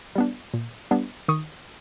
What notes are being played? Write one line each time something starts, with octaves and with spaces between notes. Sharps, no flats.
G3 B3 D4
A#2
G3 B3 D4
D#3 C#6 D#6